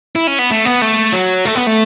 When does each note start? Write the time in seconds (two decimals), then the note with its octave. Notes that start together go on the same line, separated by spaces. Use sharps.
0.15 E4
0.27 C#4
0.39 B3
0.51 A3
0.65 B3
0.82 A3
1.13 F#3
1.45 A3
1.55 B3
1.67 A3